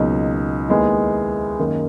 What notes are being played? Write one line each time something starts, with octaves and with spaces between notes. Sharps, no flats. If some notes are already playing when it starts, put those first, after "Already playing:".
Already playing: C#2 B2 F#3 A#3 D#4
D#2 D#3 G#3 B3 E4
F#2 D#3 A#3